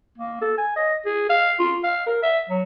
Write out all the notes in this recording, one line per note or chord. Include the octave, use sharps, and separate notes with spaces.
A#3
A4
G#5
D#5
G#4
F5
F4
F5
A#4
E5
F#3